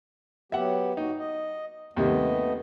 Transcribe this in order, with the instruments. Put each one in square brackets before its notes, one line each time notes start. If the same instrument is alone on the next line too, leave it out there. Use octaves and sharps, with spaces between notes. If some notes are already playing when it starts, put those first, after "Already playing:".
[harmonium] F#3 B3 G4 [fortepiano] E5 F#5
[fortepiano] D#4 [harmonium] F#4
[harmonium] D#5
[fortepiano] D#2 C3 G3 [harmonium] A3 B3 D#5